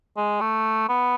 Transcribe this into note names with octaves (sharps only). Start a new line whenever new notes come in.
G#3
A3
B3